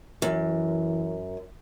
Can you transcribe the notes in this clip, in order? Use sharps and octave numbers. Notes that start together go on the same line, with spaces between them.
F#2 E3